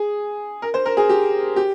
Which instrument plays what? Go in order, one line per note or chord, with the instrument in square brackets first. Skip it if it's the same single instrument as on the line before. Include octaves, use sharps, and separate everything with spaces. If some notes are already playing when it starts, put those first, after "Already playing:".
Already playing: [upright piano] G#4
A#4
C5
A#4
G#4
G4
G4